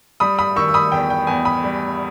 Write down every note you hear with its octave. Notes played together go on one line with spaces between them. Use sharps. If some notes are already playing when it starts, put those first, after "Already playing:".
G3 B5 D#6
B5 D#6
D#3 C#6 E6
E6
B5 D#6
E2 G5
G5
E2 G#5
B5 D#6
G3